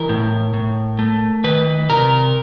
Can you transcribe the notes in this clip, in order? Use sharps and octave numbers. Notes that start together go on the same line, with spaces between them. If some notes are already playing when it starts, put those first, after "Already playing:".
Already playing: E3 A#4
A2
A2
A3
D#3 B4
C3 A#4